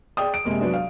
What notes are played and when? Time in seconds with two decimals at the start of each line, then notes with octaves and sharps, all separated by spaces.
0.17 G#4 D5 G5 D#6
0.34 D7
0.45 C3 G#3 A#3
0.61 F#3 B3 D4
0.73 F5